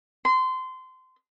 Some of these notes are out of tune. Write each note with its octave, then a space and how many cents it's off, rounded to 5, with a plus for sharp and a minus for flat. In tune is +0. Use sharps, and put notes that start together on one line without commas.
C6 -25